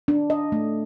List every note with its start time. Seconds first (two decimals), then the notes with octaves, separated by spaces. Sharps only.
0.08 D4
0.30 D#5
0.52 A3